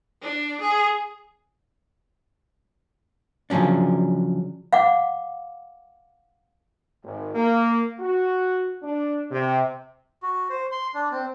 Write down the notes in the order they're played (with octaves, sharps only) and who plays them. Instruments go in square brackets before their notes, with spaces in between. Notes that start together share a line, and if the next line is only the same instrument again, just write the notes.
[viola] D4
G#4
[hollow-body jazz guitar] C#3 F3 F#3 C#4 D4
[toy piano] F5 F#5 D6
[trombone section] G#1
A#3
F#4
D4
C3
[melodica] F#4
C5
C6
D4
C4